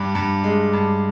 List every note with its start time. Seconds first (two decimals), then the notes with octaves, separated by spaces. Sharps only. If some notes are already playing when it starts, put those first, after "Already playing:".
Already playing: G2 D4
0.15 G2
0.44 G#3
0.73 G2